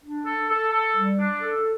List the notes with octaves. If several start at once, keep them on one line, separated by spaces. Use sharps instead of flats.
D4
A4
A4
A4
G3
D4
A4